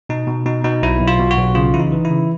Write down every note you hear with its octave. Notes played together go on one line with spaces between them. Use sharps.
B2 D#4
B2
B2 D#4
B2 D#4
B1 E4
B1
F4
B2
F#4
B1
C#3 F4
E3 E4
D#4
E3
E4
C#3